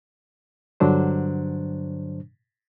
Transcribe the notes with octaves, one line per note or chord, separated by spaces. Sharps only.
G2 D3 F#3 D4 C5